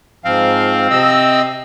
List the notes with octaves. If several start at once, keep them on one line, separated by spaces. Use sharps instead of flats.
G#2 F3 C4 F5
C3 D#5 E6